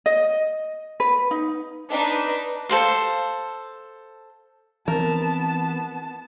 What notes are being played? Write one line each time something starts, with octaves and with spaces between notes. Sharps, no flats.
D#5
B4
D#4
D4 D#4 B4
A4 C5 F5
E3 B3 C4 A#4 A5